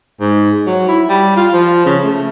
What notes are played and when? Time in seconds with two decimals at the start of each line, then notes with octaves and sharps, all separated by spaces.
0.20 G#2
0.67 F#3
0.88 E4
1.09 G3
1.36 F4
1.53 F3
1.86 C#3
2.04 A3